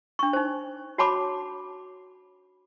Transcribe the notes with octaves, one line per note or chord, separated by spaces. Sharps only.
D4 C#6
D#4 C5
F#4 C#5 A5 B5 D6